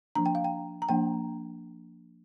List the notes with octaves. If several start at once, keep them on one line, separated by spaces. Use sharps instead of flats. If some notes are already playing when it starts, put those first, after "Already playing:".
F3 A#3 D4 A#5
G5
F5
G5
A#5
F3 A#3 D4 G5